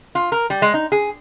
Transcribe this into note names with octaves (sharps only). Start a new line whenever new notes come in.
F4
A#4
G3
G#3
D#4
G#4